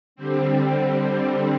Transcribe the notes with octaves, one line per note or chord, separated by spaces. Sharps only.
D3 G3 C4